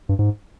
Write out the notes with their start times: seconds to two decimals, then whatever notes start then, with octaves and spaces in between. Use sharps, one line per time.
0.09 G2
0.19 G#2